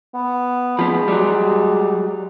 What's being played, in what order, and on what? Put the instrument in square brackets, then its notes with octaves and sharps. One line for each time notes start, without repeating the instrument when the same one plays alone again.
[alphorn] B3
[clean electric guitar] F3 B3 [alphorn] G#3
[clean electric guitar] F#3 G3